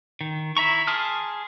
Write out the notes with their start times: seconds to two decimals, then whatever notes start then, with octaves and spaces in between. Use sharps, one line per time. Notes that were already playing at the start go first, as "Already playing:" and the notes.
0.21 D#3
0.57 E4 E5 A#5 C#6
0.87 G#4 A5 C6 D#6 F6